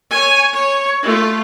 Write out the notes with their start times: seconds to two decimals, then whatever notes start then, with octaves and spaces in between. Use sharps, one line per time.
0.10 C#5 G#5
0.53 C#5
1.03 A3 F4